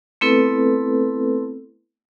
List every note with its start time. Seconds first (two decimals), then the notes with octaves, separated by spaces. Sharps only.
0.21 A3 B3 C4 E4 A4 B4